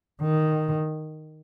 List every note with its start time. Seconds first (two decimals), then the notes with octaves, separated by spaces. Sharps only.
0.22 D#3